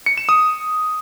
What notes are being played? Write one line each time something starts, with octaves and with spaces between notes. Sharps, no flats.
C#7
E7
D#6